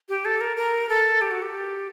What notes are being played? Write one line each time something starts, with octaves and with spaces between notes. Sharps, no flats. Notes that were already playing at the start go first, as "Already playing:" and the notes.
G4
A4
A#4
A#4
A4
G4
F#4
G4